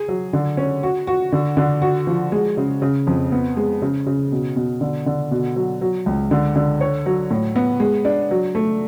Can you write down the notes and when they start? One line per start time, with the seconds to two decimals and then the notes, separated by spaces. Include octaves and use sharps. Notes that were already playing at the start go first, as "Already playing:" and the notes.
Already playing: G#4
0.08 F#3
0.33 D3
0.57 C#4
0.83 F#4
1.07 F#4
1.32 D3
1.57 D3
1.82 F#4
2.07 F3
2.32 G#3
2.57 C#3
2.82 C#3
3.07 F2
3.32 B3
3.57 G#3
3.82 C#3
4.06 C#3
4.32 B2
4.56 B2
4.81 D3
5.06 D3
5.31 B2
5.56 F#3
5.81 F#3
6.06 C#2
6.31 D3
6.56 D3
6.81 C#5
7.06 F#3
7.31 A2
7.56 B3
7.80 G#3
8.05 D4
8.31 F#3
8.55 A3